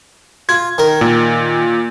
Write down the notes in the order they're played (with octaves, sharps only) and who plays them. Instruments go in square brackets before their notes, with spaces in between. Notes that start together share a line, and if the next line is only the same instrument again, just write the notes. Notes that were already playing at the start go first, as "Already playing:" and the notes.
[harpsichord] F4 [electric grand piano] G#6
[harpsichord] D#3 A#4
[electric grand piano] A#2